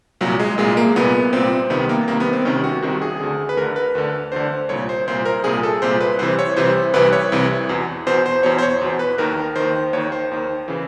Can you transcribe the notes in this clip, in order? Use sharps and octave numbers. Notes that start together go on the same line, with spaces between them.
C2 A#2 F#3
G#3
C2 A#2 G#3
A#3
C2 A#2 B3
C2 A#2 C4
C2 C3 D#3 B3
A#3
C2 C3 D#3 A#3
B3
C4
C2 C3 D#3 C#4
F#4
C2 C3 D#3 F#4
G#4
D2 D3
B4
D2 D3 A#4
B4
D2 D3
D2 D3 C5
C2 A#2 C#5
C5
C2 A#2 C5
A#4
C2 A#2 G#4
A4
C2 A#2 C5
B4
C2 C3 E3 C5
C#5
C2 C3 E3 C5
C2 C3 E3 B4
C#5
C2 C3 E3
E2 B2
E2 B2 C5
C5
E2 B2 C#5
C5
C#5
E2 B2
B4
D#2 D#3 A#4
D#2 D#3 C5
D#2 D#3 C#5
C5
D#2 D#3
C#3 E3